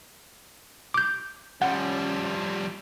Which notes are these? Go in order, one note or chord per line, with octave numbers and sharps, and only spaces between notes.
D6 G6
F3 G3 C#4 F#5